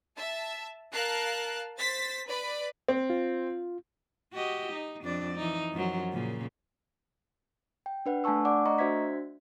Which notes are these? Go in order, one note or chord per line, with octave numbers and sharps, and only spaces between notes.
E5 A5
A#4 F5 A5 F#6
C5 A6 B6
B4 D5 B5
C4
F4
F#4 G4 D#5
D#4
F2 D4 D5
E3 D#4
F#2 F3 F#3
A#2 C#3
G5
D4 B4 F#5
A3 D4 G#5 A5 C#6 E6
D5 F#5 D6
A3 D4 D#5 A#5 C#6
D4 F#4 C5 E5 G#6 B6